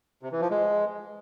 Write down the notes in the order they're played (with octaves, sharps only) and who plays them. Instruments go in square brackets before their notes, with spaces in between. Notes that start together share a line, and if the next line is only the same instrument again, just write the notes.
[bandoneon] C3
E3
F3
G#3